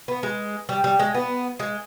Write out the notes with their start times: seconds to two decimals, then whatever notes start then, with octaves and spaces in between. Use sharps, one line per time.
0.08 B3
0.23 G#3
0.69 G3
0.84 G3
0.99 G#3
1.15 B3
1.60 G#3